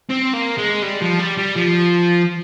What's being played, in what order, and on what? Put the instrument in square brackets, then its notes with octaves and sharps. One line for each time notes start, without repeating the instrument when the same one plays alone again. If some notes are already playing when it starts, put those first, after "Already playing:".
[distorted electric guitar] C4
A#3
G#3
G3
F3
G3
G3
F3